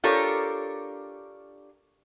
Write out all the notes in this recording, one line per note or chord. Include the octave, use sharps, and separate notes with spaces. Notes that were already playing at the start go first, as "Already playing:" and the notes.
D4 F4 G4 A4 A#4 C#5